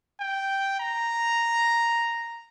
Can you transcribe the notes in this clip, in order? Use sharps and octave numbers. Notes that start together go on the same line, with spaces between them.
G5
A#5